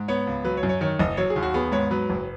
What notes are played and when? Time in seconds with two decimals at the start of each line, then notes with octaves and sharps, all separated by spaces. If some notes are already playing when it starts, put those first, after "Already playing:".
Already playing: G#2
0.08 B3 C#5
0.27 C#2
0.45 F#3 B4
0.57 C#5
0.63 F#2
0.69 C#5
0.81 D#3 C#5
0.99 F#1 D#5
1.17 F#3 C#5
1.30 G#4
1.36 D#2
1.42 F#4
1.54 B3 G#4
1.72 G#2 C#5
1.91 F#3 B4
2.10 F#1